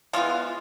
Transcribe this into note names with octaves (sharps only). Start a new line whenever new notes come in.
E3 F3 G#3 B3 F4